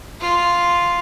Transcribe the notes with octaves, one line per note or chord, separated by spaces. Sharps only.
F4